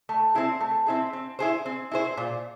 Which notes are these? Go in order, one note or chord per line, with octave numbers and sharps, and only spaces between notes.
A3
C4 E4 G#4
A3
C4 E4 G#4
C4
E4 G#4 C5
C4
E4 G#4 C5
A#2